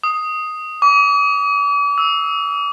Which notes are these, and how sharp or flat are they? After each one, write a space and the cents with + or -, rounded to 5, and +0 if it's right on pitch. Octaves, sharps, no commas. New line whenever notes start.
D#6 +0
D6 -40
E6 -20